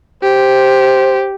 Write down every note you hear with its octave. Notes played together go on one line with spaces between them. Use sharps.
G4 C5